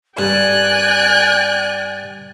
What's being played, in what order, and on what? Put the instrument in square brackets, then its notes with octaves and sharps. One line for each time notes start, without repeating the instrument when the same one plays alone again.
[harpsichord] G2 [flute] D5 [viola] G5 G#5 [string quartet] F#6